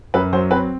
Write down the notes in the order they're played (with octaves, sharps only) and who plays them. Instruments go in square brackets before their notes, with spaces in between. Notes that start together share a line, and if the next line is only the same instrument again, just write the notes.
[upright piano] F#2 B4
F#3 C5
C4 B4